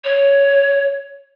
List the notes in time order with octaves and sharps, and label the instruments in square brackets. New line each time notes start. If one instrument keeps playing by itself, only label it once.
[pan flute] C#5